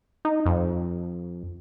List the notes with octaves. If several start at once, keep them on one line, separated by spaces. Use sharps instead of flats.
D#4
F2